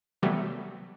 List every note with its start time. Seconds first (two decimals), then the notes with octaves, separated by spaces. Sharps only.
0.22 C3 E3 F#3 G3 A3 B3